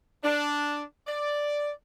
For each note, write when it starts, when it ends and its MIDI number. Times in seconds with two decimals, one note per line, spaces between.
0.24 0.82 62
1.07 1.69 74